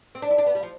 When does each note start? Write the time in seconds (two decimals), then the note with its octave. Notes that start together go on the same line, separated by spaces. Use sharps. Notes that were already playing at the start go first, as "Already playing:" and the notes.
0.15 C4
0.22 D4
0.31 E4
0.38 D4
0.46 B3
0.55 G3
0.63 F3